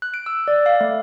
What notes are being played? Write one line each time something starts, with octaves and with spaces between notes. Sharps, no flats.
F#6
D7
E6
D5
F5
A3